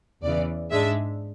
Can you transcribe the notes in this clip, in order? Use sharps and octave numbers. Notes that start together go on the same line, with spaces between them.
E2 C#3 E3 D5
G#2 G#3 D4 E5